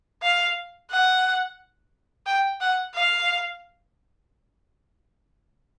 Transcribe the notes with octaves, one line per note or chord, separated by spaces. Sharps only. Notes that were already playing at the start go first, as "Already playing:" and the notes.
F5
F#5
G5
F#5
F5